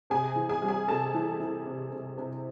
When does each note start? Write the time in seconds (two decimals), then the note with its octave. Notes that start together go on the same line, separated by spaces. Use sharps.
0.10 C3 G#4 G#5
0.36 E3
0.49 G#4 G#5
0.62 G3
0.68 G#4 G#5
0.88 C3 A4 A5
1.14 E3
1.40 E3
1.66 C3
1.92 C3
2.18 C3